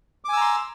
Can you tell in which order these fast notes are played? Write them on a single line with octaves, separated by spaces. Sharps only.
D6 G#5 E6 A#5 C6